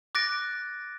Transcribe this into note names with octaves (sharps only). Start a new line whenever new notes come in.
D6 F#6 A6 A#6 D7